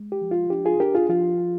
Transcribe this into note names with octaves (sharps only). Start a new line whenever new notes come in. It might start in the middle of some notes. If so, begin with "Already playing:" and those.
Already playing: G#3
G4
F3
F4
D4 G4
F4 G#4
D4 G4 A#4
F4 G#4
F3 F4